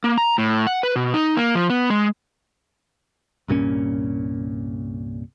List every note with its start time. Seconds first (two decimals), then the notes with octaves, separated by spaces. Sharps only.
0.04 A#3
0.18 A#5
0.38 A2
0.67 F#5
0.83 B4
0.96 B2
1.14 D#4
1.37 A#3
1.55 F3
1.70 B3
1.90 G#3
3.48 C2 G2 A#2 C#4